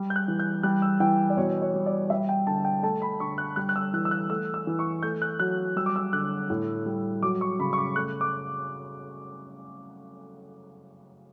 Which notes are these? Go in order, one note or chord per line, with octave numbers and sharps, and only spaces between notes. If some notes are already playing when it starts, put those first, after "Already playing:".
Already playing: G3
G6
F#6
E3
G6
G3 F#6
E6
E3 G5
D5
B2 C#5
C#5
G3
D5
G3 E5
G5
D3 A5
G5
A3 A5
B5
D3 C#6
F#6
G3 F#6
F#6
E6
E3 F#6
E6
F#6
A3 E6
E6
E3
C#6
A3 G6
F#6
F#3 F#6
G3 E6
D6
E6
D3 F#6
A2
G3
F#3 D6
C#6
C#3 B5
C#6
D6
A3 F#6
D6